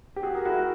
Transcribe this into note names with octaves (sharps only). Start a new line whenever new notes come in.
G4
F#4 G#4
G#4 A#4
E4 F#4